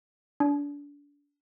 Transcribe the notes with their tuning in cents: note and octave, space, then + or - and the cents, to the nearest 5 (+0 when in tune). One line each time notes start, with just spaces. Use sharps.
D4 -30